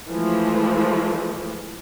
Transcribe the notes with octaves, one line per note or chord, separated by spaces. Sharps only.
E3 F3 G#3 A3